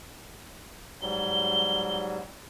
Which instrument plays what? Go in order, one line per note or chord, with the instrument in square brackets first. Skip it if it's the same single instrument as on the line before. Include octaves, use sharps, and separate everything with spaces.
[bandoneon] G#2 F#3 G3 [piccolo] G7